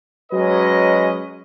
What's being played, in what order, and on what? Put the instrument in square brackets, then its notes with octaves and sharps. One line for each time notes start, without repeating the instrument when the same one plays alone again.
[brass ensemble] F#3 G#3 C#4 B4 D#5